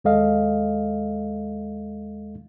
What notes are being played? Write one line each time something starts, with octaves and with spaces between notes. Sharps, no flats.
D#2 G#3 A4 D#5 F5